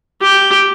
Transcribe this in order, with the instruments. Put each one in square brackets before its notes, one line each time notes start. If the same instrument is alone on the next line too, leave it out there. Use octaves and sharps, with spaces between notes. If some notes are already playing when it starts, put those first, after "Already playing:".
[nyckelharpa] G4